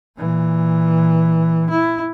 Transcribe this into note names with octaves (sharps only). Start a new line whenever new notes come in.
A#2 E3
E4